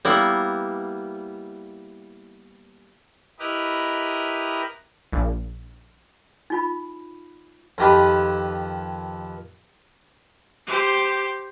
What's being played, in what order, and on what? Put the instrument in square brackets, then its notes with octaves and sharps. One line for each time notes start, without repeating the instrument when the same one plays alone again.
[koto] G3 A#3 B3 E4
[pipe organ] E4 G4 A#4 B4 D#5
[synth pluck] A#1
[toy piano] D#4 F4 B5
[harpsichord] F2 D#3 G4 B4
[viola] G4 C5